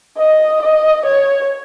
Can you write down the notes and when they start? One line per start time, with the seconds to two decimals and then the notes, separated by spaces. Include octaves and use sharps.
0.18 D#5
0.62 D#5
1.05 C#5